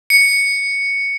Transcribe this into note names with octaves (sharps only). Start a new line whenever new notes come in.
C#7